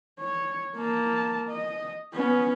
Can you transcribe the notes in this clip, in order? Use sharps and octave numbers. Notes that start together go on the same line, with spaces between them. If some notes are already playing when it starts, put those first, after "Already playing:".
C#5
A#3 A5
D#5
B3 C#4